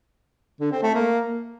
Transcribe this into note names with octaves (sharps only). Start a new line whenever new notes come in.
D3
C4
A3
A#3